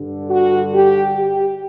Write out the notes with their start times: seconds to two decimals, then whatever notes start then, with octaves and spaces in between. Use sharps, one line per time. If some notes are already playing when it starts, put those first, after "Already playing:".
Already playing: G2 D3
0.30 F#4
0.73 G4
1.14 G4